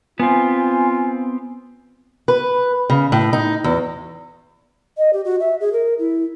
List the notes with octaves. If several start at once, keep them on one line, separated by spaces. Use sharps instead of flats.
B3 C4 F4 G#5
B4
C#3
A2
D#4
E2
D#5
G4
F#4
E5
G#4
A#4
E4